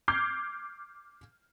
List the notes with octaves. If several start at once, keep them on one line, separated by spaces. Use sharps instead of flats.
D6 F6 G6 G#6 C7